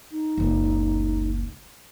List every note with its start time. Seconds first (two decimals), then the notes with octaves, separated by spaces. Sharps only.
0.12 D#4
0.38 F#1 C#2